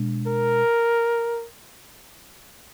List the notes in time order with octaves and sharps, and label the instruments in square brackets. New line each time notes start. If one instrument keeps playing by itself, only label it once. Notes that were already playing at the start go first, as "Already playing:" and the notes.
Already playing: [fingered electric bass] B2 G#3 D4
[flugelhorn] A#4